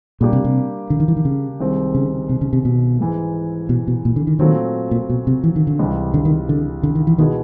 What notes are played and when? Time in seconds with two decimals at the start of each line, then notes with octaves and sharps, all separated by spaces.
0.20 A#2 G3 A#3 D4 G4
0.33 C3
0.44 C3
0.90 D3
1.00 D#3
1.08 E3
1.17 D#3
1.25 C#3
1.60 C2 C3 D#3 G#3 C4
1.95 C#3
2.29 C3
2.41 C#3
2.53 C3
2.65 B2
3.00 G#2 E3 G#3
3.69 B2
3.87 B2
4.05 A#2
4.16 D3
4.27 D#3
4.39 A#2 D#3 F#3 A3 C4
4.91 A#2
5.09 B2
5.27 C3
5.44 E3
5.56 D#3
5.67 D3
5.79 C#2 C3 E3 G3
6.14 D3
6.25 D#3
6.49 D3
6.83 D3
6.95 D#3
7.07 E3
7.18 B2 D#3 G#3 B3 E4 G#4